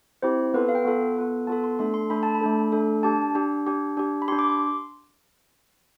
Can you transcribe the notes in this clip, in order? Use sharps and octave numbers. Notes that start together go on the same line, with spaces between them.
C4 E4 G4 C5
B3 F4 A4 B4
F5
G5
B3 F4 A4
B3 F4 A4
B3 F4 A4 A5
C6
A3 D4 A4 C6
C6
A3 D4 A4 B5
A5
B5
A3 D4 A4
A3 D4 A4
D4 G4 A5
D4 G4
D4 G4
D4 G4
B5
D4 G4 C6
D6
C6